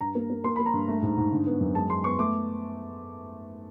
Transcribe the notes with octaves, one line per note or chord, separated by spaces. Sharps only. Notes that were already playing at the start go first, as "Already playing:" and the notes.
G2 A#5
A#3
A#3
A#3 C6
A#3 B5
A#5
G2
A3
G#2
G#2
D3
B3
F#2
G#3 A5
G#3 C6
B3 C#6
A3 D6